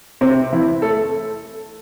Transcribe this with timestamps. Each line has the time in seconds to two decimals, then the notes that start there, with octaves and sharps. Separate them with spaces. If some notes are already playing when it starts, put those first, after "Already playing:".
0.21 C3 C4
0.52 E3 E4
0.82 A3 A4